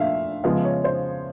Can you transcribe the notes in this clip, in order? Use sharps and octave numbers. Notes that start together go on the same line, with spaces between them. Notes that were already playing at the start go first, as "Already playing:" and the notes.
Already playing: A#2 F3 A3 D4 E5 F5
C#3 F3 G#3 B3 F5
C#5
C5